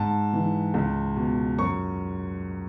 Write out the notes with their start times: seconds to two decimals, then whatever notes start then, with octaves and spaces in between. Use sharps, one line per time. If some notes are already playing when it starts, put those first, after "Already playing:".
Already playing: G#2 A5
0.33 E3
0.74 C#2
1.17 B2
1.58 F#2 C#6